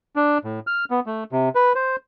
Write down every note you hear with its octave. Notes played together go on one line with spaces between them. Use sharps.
D4
A2
F6
B3
A3
C3
B4
C5